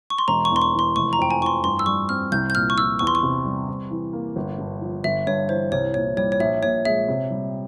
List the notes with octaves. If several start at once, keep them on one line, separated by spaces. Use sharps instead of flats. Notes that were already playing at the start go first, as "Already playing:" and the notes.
C#6
C6
E1 A#5
C#6
E2
C6
C#6
E3
C6
F1 C#6
A#5
F2 G5
G#5
E3 C#6
C6
G2 C6
E6
G3 C#6
C4 F6
C2 G6
G6
A#2 F6
C#6
F3 E6
E2 C#6
C6
C#6
C3
G3
C3
E3
A#3
G1
G2
F3
G1 E5
G2 C#5
E3 C5
C2 C#5
A#2 C#5
G3 C#5
C#5
A#1 E5
A#2 C#5
G#3 E5
C3
G3